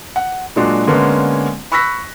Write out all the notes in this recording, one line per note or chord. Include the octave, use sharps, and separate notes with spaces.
F#5
A#2 F#3 G#3 D4 F#4
D3 G#3 A#3 B3 C#4
B5 C#6 E6 F#6 A#6 B6